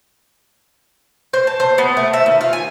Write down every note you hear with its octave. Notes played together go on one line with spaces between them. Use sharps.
C5
A5
C5
B3
A3
E5
D#3
F4
G#5